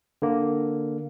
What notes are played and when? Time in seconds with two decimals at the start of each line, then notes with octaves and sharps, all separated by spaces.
0.22 D3 A#3